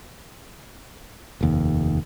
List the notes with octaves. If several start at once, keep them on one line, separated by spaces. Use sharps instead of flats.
F1 D#2